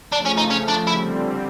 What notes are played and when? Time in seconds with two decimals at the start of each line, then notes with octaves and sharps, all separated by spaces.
0.12 C#3 F3 A3 D4
0.25 C#4
0.37 D#4
0.50 C#4
0.68 D4
0.87 D3 G3 C4 E4